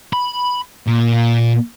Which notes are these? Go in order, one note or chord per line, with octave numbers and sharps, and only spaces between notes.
B5
A#2